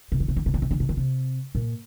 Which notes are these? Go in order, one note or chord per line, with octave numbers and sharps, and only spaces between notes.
C3
D3
C3
D3
C3
D3
C3
D3
C3
D3
C3
A#2